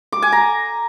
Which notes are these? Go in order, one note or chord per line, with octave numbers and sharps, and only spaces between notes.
D6
G#5
A#5